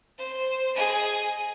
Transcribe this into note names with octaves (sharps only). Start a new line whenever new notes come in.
C5
G#4 D#5